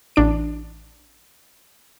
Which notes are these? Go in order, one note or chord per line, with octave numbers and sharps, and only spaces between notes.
A1 D4 D7